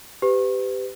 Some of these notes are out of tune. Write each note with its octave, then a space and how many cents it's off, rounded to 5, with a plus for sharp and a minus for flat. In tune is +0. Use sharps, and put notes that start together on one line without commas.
G4 +0 B4 +35